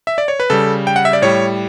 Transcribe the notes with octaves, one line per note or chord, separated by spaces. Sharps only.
E5
D5
C#5
B4
C#3 G3 A4
G5
F#5
E5
D5
A2 G3 C#5